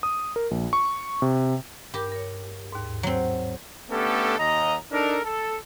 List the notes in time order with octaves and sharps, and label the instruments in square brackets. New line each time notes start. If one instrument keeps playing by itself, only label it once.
[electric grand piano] D#6
A#4
A#1
C#6
C3
[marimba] G2 A#4 D6 [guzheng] G4
[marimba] A#4 C#5
D#2 G#2
[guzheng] F#3 C4
[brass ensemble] A3 B3 C#4 D4 G4 A4
D#2 D#5 A#5
D4 D#4 A4 A#4
A4